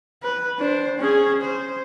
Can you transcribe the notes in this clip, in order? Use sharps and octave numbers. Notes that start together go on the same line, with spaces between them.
B4
D4 C5
C#4 G#4
C5